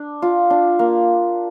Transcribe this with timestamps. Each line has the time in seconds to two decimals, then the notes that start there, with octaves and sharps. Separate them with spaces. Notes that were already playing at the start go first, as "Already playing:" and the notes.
Already playing: D4
0.22 F4
0.50 D4
0.79 A#3